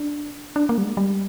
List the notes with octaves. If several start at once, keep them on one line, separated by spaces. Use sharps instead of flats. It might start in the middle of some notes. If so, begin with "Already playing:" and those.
Already playing: D4
D4
A#3
G3
G#3
G3